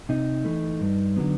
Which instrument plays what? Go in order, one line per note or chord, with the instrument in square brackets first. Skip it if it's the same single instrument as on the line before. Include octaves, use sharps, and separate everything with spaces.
[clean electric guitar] C3 D#4
E3 A3
G2
D3 F#3 B3